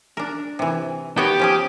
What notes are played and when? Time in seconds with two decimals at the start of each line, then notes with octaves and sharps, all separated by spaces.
0.17 D4 A#4
0.59 C3 E3
1.18 B3 F#4 G4 C#5
1.39 F3 C#4 G#4